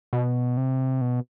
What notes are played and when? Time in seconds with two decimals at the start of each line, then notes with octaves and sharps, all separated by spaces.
0.13 B2
0.57 C3
1.01 B2